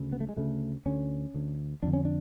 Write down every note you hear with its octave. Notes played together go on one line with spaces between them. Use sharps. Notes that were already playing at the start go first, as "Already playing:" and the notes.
Already playing: D2 C#3
B3
A3
G#3
D2 C#3 A3
D2 D3 C#4
D2 D3
F2 D3 D4
C#4
D4